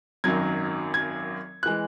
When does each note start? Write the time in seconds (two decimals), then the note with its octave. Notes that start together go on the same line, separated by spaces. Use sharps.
0.24 G#1 F#2 D#3 F#3 G#6
0.94 G#6
1.63 E3 G#3 F#6